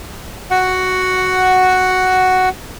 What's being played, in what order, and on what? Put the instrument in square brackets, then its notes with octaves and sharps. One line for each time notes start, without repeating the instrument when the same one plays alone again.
[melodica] F#4 F#5